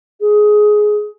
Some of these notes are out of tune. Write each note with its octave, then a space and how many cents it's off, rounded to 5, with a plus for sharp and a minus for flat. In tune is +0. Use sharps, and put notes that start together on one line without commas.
G#4 +15